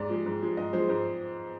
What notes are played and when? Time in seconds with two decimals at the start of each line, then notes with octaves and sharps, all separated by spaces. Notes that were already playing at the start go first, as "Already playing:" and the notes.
Already playing: G#2 D5
0.09 F3 G#3
0.26 G#2
0.42 F3 G#3
0.57 G#2 D#5
0.73 F3 G#3 C5
0.88 G#2 C5